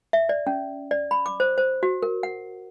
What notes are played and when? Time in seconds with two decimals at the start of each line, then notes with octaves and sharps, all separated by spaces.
0.13 E5
0.29 D5
0.47 C#4
0.91 D5
1.11 B5
1.26 D6
1.40 C5
1.58 C5
1.83 F#4
2.03 A#4
2.23 F#5